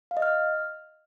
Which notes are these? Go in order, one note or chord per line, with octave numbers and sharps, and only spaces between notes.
F5
D#5
F6